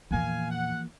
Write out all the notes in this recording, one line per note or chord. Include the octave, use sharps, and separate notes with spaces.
E2 A#2 E3 F3 A#3 F5 G#5
F#5